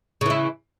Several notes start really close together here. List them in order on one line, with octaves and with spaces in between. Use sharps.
C#3 E3 E4